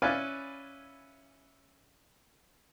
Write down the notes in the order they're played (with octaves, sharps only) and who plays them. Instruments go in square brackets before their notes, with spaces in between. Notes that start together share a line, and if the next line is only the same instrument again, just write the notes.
[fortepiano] C#4 E4 B4 D5 F5 G#5